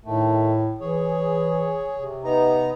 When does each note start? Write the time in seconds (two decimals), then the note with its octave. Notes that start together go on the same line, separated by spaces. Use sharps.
0.05 A2 D#3 A3
0.80 E3 G#4 C#5
1.95 C3
2.24 B3 D#4 A#5